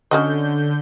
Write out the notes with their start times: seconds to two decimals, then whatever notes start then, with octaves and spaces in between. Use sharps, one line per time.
0.11 D3 C#4 F#4 D#5 G6